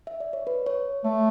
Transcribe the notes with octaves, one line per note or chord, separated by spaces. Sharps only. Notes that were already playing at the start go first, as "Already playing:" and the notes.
E5
D5
C#5
B4
C#5
A3 C#5